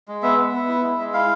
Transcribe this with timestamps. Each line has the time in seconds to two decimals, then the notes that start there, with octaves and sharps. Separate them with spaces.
0.08 G#3
0.23 B3 E5
0.37 B3
0.53 B3
0.68 E4
0.83 G#3
0.99 G#3
1.13 E4 F5